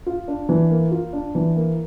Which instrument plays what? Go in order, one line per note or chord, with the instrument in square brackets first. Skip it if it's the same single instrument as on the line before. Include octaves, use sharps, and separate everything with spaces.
[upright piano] F4
D4
E3
A#3
F4
D4
E3
A#3